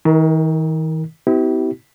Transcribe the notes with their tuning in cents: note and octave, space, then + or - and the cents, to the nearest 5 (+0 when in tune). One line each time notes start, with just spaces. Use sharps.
D#3 +45 A#4 +0
B3 +45 E4 -25 G4 -35